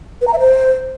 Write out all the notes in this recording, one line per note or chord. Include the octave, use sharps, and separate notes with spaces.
B4
A#5
E5
C5